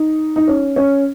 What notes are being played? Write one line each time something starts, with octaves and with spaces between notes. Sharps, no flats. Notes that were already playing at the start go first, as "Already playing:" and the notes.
Already playing: D#4
D#4
C#4
C#4